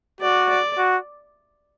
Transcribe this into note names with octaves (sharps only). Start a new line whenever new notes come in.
F#4 D5
D5
F#4